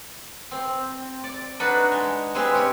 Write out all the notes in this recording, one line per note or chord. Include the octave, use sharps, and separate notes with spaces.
C4
D5
D4 D#4 F#4 B4
G#3
G#3 C4 G#4 B4
C#4 G4